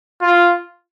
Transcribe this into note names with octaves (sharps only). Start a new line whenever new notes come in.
F4